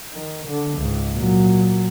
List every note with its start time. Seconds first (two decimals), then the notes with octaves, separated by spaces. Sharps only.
0.13 D#3
0.47 D3
0.78 C#2 G#2
1.12 A#2 F#3